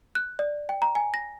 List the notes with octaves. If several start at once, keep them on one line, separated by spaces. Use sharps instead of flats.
F#6
D5
G5
A#5
G#5
A#6